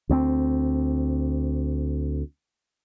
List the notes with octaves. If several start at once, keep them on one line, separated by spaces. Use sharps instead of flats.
D2 B3 C4